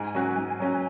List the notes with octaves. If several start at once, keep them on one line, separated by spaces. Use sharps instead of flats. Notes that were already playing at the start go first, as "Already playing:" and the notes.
Already playing: G#2 G#5
F#3 C#4 F#4
G#2
F#3 C#4 F#4